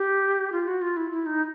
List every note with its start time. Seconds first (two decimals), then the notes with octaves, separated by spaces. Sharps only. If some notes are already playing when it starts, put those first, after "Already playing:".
Already playing: G4
0.52 F4
0.68 F#4
0.82 F4
0.97 E4
1.11 E4
1.26 D#4